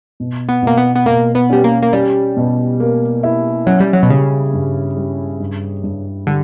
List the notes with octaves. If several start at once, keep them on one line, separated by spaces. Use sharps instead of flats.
B2
B3
B2 A#3
B3
B3
B2 A#3
B3
G3 C#4
A#3
A#3
G3 C#4
B2
A#3
E4
F#3 C#4
G3
F#3
B2
C#3 G3
G2
G3
G2
G2
D3 G3